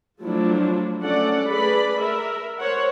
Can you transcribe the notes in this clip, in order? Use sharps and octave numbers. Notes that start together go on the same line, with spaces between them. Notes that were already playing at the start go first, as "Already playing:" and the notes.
F3 F#3 A3 D4 E4 F4
A3 C#4 A4 D5 F#5
A3 G#4 B4 D5 B5
A#4 E5
A#4 C5 C#5 F#5